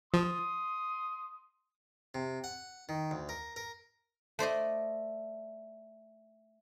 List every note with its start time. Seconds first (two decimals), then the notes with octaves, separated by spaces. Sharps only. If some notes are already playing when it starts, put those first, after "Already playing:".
0.14 F3 C6 D#6
2.14 C3
2.44 F#5
2.89 D#3
3.11 D2
3.29 A#4
3.56 A#4
4.39 A3 C5 D5 D#5